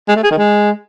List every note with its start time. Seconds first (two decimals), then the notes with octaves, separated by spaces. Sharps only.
0.09 G#3
0.16 A3
0.23 G#4
0.31 D#3
0.38 G#3